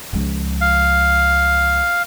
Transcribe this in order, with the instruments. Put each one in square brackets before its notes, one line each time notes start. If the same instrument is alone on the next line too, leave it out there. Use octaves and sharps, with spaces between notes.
[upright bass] C#2 F3
[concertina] F5